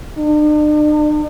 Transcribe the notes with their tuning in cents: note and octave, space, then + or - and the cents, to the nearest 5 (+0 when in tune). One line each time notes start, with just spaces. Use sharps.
D4 +45